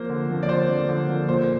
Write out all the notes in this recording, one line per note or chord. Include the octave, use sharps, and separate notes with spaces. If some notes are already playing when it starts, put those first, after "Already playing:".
Already playing: F3 A#3 C5
D3
F3 A#3
D5
D3 C5
F3 A#3
D3
F3 A#3
A#2 C5